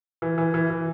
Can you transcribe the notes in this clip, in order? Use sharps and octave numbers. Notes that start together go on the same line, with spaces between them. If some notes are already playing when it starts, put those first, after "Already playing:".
E3
E3
E3
E3